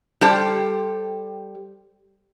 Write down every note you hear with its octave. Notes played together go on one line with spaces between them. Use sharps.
G3 G4 A4 C5 A5